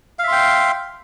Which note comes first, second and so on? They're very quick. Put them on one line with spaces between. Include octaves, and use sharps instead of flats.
F5 E5 C6 G5